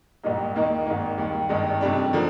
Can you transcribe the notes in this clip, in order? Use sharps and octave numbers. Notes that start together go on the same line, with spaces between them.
A#1 G#2 G3 A#3 D#4
D#2 D#3 A#3 D#4
G#1 G#2 D#3 A#3
D#2 D#3 G3
G#1 G2 D#3 G#3
F2 C3 D#3 G3 D4
D3 F3 A#3 D4